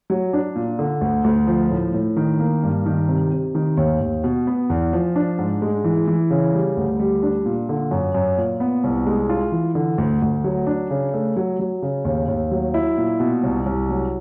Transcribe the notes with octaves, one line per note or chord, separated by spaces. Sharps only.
F#3
D4
A#2
D3
D2
D2
F3
A2
A2
D#3
A#3
G2
D#3
C3
C3
D#3
D#2
D#2
B2
B3
E2
F3
D4
G#2
G#3
E3
E3
C#3
G3
D2
G3
D4
A#2
D3
F#2
F#2
A#2
B3
C2
G#3
F4
E3
D3
D2
D2
F#3
D4
C#3
A3
F#3
F#3
C#3
D#2
D#2
F#3
E4
A#2
B2
C2
C2
F#3